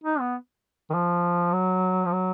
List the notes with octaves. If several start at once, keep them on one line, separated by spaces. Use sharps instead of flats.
D#4
B3
D#3
F3
F#3
F3
F#3